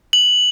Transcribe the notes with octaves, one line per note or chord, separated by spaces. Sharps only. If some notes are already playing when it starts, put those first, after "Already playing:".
F#7